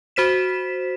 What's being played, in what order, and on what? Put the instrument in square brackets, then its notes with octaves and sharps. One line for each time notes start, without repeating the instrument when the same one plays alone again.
[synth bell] F#4 C5 B6 E7